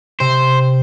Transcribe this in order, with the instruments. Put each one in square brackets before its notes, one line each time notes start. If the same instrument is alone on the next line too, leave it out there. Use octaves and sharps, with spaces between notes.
[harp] C3 [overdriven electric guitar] C5